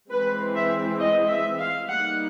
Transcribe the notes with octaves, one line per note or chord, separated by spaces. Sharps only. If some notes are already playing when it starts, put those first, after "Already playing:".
E3 G#3 C4 B4
E5
D#5
E5
F5
G3 A#3 D#4 F#5